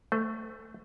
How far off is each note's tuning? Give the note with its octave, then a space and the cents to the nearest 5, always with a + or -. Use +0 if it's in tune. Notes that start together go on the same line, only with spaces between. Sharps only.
A3 +15 C5 -45